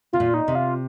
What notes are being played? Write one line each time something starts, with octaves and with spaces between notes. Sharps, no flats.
C3 F4
A#2
D#4
C3
F4